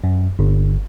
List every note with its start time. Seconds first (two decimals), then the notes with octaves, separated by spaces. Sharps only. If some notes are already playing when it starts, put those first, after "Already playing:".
0.04 F#2
0.39 G1